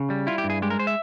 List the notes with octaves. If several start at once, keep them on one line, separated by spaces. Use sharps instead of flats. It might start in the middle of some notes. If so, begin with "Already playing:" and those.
Already playing: C#3
G3
E4 F4
G4
G2
G#4
G#3 G4
A#4
C5
E5